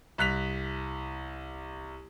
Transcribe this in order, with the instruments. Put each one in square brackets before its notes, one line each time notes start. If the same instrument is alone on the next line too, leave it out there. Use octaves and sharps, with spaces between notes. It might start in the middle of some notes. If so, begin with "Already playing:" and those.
[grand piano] C2 F#6 B6 F7